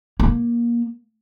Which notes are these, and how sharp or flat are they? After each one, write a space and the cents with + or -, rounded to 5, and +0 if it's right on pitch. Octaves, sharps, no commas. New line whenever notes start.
A#3 +20